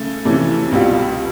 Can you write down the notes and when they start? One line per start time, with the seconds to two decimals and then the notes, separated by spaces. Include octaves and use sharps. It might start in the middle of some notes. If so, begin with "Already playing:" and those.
Already playing: C#3 A3
0.25 F2 C3 E3 A3 C#4
0.72 C#2 B2 G3 C4 F4